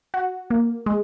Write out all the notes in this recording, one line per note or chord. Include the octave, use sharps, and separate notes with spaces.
F#4
A#3
G#3